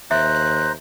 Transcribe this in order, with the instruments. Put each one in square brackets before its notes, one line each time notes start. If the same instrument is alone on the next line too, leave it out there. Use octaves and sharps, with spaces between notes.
[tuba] D#2 [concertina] C5 A#5 [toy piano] E5 [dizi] F#6